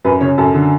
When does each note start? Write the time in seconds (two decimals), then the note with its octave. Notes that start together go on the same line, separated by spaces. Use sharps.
0.05 F#2 B4
0.21 C#3 C#5
0.38 F#2 A4
0.54 D3